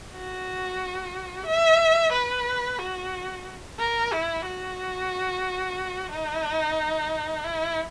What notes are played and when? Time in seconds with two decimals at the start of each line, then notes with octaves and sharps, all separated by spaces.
0.13 F#4
1.46 E5
2.13 B4
2.79 F#4
3.79 A#4
4.13 E4
4.46 F#4
6.11 D#4
7.44 E4